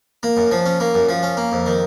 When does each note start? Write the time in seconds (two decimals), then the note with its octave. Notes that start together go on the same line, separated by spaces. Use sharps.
0.23 A#3
0.37 F#2
0.51 F3
0.66 C#4
0.80 A#3
0.94 F#2
1.09 F3
1.23 C#4
1.37 A#3
1.52 F2
1.66 D#3